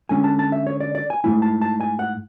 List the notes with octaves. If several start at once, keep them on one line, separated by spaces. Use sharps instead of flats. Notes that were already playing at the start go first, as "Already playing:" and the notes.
D3 G#3 C#4 G#5
A5
A5
E5
C#5
D5
D5
G#5
G#2 F#3 A3 E4 G#5
A5
A5
G#5
F#5